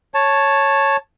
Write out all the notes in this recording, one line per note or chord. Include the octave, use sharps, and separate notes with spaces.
C#5 A5